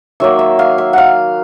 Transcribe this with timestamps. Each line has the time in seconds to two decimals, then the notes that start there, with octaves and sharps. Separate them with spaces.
0.20 D#3 F#3 A#3 E5
0.39 E5
0.59 F5
0.78 E5
0.93 F5 F#5